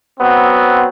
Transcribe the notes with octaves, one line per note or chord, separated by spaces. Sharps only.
F#3 B3 C4